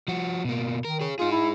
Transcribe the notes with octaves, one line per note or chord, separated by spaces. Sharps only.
F3 F#4
B2 A#3
D#3 A#4
G#4 C#5
D#4 F4 G#4
E4